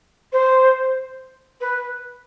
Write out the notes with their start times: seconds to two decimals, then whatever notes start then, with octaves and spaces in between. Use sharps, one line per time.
0.32 C5
1.61 B4